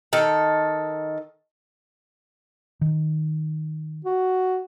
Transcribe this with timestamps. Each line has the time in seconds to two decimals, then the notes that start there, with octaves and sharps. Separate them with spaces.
0.13 D#3 A4
2.81 D#3
4.05 F#4